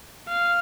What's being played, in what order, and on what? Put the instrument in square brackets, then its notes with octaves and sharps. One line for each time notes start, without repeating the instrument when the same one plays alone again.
[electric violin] F5